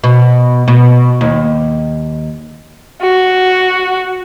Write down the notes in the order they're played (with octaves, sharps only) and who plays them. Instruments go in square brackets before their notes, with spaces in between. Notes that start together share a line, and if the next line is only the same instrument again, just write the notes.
[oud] B2
B2
D#2
[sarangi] F#4